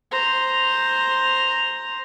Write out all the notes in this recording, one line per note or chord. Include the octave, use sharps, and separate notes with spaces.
C5 A#5